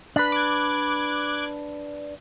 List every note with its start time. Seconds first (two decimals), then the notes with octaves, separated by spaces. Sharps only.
0.16 D4 B4 F#6 B6
0.32 D6 F#6 G#6